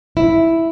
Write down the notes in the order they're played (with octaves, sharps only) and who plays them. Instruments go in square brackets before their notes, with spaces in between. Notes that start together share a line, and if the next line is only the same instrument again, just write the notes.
[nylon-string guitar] E4